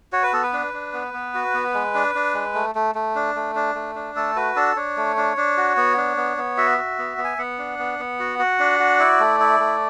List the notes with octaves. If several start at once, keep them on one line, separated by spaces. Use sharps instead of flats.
F#4 C#5
B4
B3 A4
B4
D4
D4
B3
B3
F#4
B3
G#3
D4
D4
G#3
A3
A3
A3
D4
A3
D4
A3
D4
A3 A4
F#4 B4
D4 A4
D4 C#5
A3
D4
D4
F#4
B3
D4
B3
B3
F#4 E5
F#4
B3
B3
G#5
B3 F#5
D4
B3
B3
F#4
F#4
D4
F#4
E4 D5
A3
E4
A3